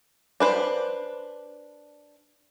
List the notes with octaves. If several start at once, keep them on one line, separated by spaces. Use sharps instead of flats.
D4 B4 C5